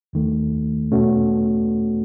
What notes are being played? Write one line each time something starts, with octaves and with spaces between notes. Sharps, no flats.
D#2 D#3 A3
E2 B2 A3 C#4 F#4